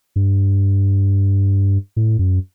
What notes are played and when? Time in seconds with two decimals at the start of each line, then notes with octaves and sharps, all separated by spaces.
0.16 G2
1.96 A2
2.19 F#2